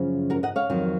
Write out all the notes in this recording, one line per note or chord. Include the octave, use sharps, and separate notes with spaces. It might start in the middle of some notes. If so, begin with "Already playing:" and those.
Already playing: F#2 C#3 F3
F#4 A#4
D#5 F#5
C#5 F5
F2 D#3 F#3